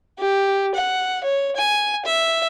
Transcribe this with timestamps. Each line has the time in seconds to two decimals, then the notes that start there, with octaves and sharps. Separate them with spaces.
0.18 G4
0.75 F#5
1.24 C#5
1.56 G#5
2.05 E5